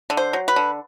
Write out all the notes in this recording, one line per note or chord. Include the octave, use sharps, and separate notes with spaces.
D3
C5
F#3
B4
D3